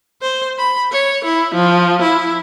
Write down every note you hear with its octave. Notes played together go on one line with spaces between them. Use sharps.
C5
B5
C#5
E4
F3
E4